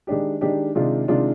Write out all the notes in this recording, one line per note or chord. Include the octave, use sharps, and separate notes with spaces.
D#3 G#3 D4 G4
D#3 G#3 D4 G4
C3 D#3 G#3 D4 F4
C3 D#3 G#3 D4 F4